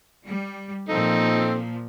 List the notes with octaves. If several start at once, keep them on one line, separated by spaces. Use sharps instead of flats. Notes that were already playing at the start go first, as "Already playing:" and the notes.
G3
A#2 F3 C4 D#4 A4